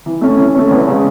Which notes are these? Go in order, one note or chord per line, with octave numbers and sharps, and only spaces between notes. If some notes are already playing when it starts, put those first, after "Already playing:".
E3
A3 C#4
E3
A3 C#4
E2
C#3 G#3